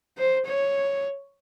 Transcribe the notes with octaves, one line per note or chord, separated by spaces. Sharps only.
C5
C#5